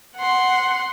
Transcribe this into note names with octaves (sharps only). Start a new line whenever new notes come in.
F#5 C6